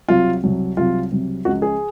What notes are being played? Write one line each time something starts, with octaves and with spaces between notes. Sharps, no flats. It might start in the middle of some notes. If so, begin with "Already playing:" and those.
C2 C3 F#3 F4
C2 C3 F#3
C2 C3 F#3 F4
C2 C3 F#3
C#2 C#3 F3 F#4
G#4